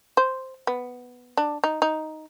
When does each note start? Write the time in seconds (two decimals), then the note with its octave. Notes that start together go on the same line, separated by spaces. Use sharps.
0.17 C5
0.67 B3
1.37 D4
1.64 D#4
1.82 D#4